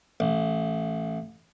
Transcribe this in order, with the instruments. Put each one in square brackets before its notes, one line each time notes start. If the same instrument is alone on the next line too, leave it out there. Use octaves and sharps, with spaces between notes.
[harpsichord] A1